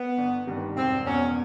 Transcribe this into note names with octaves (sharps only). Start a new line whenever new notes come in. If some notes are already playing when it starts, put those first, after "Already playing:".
Already playing: B3
G1
G2 D#3 G3
E1 C4
E2 B2 C#4